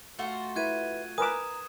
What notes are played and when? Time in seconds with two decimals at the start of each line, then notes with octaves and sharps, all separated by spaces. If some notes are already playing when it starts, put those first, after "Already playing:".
0.19 A3 F4 F#4
0.56 E4 B4 F#6 G#6 D#7
1.18 A#4 B4 G#5 A#5 D6 D#6 E7